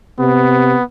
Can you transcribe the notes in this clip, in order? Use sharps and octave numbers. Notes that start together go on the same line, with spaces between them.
C3 B3